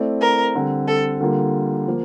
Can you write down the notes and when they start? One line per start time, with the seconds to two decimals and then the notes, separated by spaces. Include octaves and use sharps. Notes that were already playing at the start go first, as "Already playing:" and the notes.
Already playing: A3 C4 E4 A4 D5
0.21 A#4
0.55 D3 G3 C4
0.87 A4
1.20 D3 G3 A#3 F4 A#4
1.88 F3 A#3